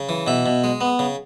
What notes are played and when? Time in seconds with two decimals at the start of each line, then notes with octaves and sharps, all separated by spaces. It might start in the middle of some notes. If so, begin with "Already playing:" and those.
Already playing: C#3
0.09 E3
0.27 B2 E5
0.46 B2
0.64 G#3
0.81 B3
0.99 C#3